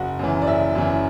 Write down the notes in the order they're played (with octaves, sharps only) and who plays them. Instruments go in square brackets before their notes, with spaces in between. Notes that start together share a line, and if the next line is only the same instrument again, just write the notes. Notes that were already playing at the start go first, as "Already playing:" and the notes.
Already playing: [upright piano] F#1 F#4
F#2 E3
D5
F#1 E5
F#2 E3